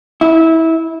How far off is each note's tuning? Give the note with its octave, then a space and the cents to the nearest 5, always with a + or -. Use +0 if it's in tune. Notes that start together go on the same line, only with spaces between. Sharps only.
E4 -20